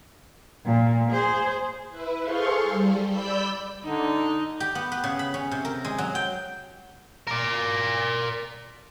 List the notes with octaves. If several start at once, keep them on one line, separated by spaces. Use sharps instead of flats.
A#2
G#4 C5
E4 B4
G#4 A4 C5 F5 C6 C#6
G3
D5 B5 E6 G6 B6
D3 D#4
G4
B3
B4
C#3
B5
C#4
C3
A#4
G#3
F#3
G5
A#4 D5